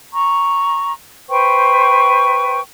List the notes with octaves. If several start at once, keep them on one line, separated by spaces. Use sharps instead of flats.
A#5 C#6
B4 C5 G5 C#6